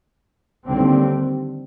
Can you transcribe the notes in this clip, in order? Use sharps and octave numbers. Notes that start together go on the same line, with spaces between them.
D#2 D3 G3 C4